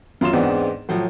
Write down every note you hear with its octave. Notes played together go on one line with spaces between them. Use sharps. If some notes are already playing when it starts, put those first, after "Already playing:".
F#2 F4 C6 E7
E2 G#2 B3 C4 D4 D#4
A2 F3 F#3